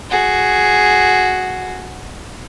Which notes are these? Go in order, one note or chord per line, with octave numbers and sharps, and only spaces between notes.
F#4 G#4